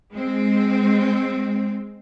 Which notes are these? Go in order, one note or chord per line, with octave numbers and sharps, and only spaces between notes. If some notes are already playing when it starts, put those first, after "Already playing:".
G#3 C4